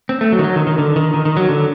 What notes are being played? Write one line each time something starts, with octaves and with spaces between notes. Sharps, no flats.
C4
A3
F#3
D#3
F#3
D#3
D#3
D3
D#3
D#3
D#3
F#3
D3